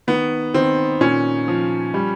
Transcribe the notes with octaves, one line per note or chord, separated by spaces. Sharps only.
D#3 B3
D#3 C4
A#2 C#4
F3
G3